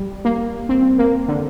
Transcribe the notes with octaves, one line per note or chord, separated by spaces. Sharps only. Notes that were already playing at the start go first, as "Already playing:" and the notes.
Already playing: G3
A#3
C4
A#3
D3